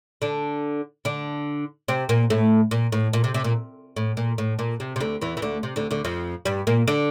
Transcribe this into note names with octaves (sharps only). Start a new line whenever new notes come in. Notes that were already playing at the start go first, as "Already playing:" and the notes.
D3 D4
D3 D4
C3 C4
A#2 A#3
A2 A3
A#2
A2
A#2
C3
C3
A#2
A2
A#2
A2
A#2
C3
C3
D2 D3
E2 E3
E3
D2 D3
C3
D2 D3
D2 D3
F2 F3
G2 G3
A#2 A#3
D3 D4